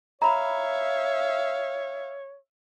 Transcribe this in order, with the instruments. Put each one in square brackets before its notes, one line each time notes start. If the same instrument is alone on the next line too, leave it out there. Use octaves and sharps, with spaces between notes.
[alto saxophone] C#5 [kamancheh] E5 F5 [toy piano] A#5 B5